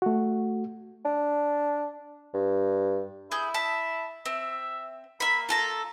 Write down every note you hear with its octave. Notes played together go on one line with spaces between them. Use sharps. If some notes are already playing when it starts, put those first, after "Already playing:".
A3 F#4
D4
G2
E4 G#4 G6
E5 A5
C4 E5
A#3 E5 B5
F4 A4 A#5